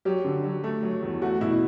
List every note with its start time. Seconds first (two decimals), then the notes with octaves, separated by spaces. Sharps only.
0.05 F#3 G4
0.24 D3
0.44 F#3
0.64 A3
0.83 F#3
1.03 E2
1.22 A3 F#4
1.40 B2 E4